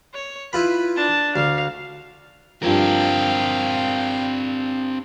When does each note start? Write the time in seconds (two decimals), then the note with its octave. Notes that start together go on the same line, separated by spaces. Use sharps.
0.14 C#5
0.53 E4 F4 B4 B5
0.97 D4 A5
1.36 D2 F5
2.63 G2 F3 C4 A#4 F5 G5